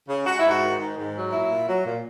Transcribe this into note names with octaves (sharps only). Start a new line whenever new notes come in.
C#3
G#3 F#4
E4
G#2
F#4
D#3
G#2
G#2
F#3
A#2 E4
A#2
F#3
A#2